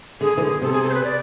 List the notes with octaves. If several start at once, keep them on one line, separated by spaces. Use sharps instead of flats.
D3 G#4
E3
D3
C3 A4
G#4
A4
C5
B4
D5